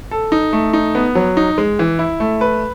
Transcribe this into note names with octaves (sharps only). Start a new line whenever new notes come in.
A4
D#4
A3
D#4
B3
F#3
D#4
G#3
E3
E4
A3
B4